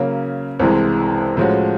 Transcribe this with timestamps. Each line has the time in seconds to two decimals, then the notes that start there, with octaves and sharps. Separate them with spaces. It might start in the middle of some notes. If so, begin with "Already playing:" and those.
Already playing: C#3 F#3 A#3 C#4
0.60 C2 C3 E3 G#3
1.37 A2 F3 G#3 C#4 F#4